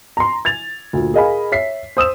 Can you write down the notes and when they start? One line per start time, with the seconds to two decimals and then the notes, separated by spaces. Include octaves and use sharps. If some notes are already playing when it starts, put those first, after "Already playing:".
0.17 A#5 C6
0.45 G#6 A6 F7
0.93 D2 A#2
1.14 G#4 A#4 D#5 F5 G#5 B5
1.52 C#5 E5 B6 C7
1.97 C5 D#6 E6 E7